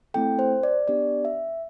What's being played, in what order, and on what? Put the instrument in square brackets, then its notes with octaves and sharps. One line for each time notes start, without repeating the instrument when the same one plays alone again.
[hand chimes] A3 C4 E4 A4 G5
C5
D5
B3 D4 G4 D5
E5